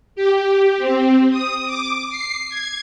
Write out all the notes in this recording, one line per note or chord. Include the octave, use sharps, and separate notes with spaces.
G4
C4
D#6
D6
C7
G#6